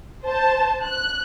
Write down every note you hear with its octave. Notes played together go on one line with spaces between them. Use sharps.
C5 A5
F#6